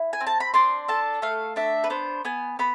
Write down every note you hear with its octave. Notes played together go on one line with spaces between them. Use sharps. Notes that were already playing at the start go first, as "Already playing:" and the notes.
Already playing: E4
G#5
C4
A5
B5
D4 C6
A4 A5
A3 F5
D4 E5
B4
B3 C5
B3 G#5
B3 B5